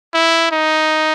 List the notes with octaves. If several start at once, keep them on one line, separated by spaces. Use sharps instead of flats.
E4
D#4